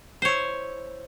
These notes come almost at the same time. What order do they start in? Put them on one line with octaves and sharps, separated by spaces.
C5 C#5 E4